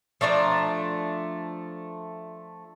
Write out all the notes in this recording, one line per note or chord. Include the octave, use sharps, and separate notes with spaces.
F3 A3 D4 A#5